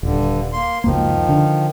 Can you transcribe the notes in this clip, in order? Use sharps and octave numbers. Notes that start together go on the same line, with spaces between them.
D#1 G2 D3
A#3 C6
C#2 F#2 D#3 F3 A#3
D3